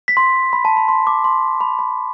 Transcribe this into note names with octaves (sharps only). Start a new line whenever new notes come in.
B6
C6
B5
A5
B5
C6
D6
C6
B5
B5